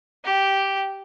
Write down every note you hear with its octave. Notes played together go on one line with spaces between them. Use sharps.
G4